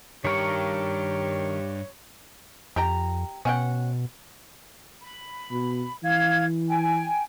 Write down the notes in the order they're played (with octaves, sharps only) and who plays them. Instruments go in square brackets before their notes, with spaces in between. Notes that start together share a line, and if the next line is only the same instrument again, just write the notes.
[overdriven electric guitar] G2 [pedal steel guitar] D#3 A#4 C#6 [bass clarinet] G4 [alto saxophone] C#5
[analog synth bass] F2 [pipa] G4 G5 A#5
[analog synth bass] B2 [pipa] C#4 F#5 G5
[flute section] B5
[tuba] B2
[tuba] E3 [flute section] F5 G#6
[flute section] G5 G#5